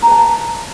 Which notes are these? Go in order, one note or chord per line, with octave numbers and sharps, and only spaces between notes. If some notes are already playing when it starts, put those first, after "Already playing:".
B4 A5 A#5